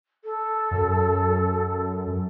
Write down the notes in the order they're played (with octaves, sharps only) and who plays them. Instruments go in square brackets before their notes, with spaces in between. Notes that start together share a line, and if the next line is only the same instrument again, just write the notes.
[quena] A4
[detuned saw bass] F#2